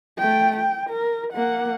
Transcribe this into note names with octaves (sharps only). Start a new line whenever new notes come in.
A3 G5
G5
A#4
A#3 F#5